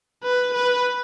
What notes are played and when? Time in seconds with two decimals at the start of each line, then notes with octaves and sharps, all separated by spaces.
0.23 B4
0.54 B4